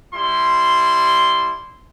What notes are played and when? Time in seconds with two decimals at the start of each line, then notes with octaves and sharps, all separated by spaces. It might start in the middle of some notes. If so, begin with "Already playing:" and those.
0.13 G3 E4 C6